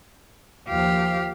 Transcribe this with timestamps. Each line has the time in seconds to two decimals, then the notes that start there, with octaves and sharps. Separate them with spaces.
0.69 D#2 F3 G4 F5